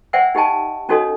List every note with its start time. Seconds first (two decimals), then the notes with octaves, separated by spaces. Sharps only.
0.13 C5 D5 E5 F#5 G5 E6
0.35 D#4 G4 D#5 G5 A5
0.89 C#4 D#4 F#4 A4 C#5 D#5